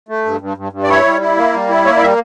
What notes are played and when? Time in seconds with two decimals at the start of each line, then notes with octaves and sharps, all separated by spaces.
0.09 A3
0.25 G2
0.41 G2
0.57 G2
0.72 G2
0.83 D5
0.89 E4 C#5
1.05 G3
1.21 E4
1.37 A#3
1.54 G3
1.69 E4
1.85 A#3 C#5
1.97 D5
2.01 G3 E5